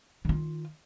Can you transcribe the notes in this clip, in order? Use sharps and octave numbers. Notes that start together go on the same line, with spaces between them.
D#3 F4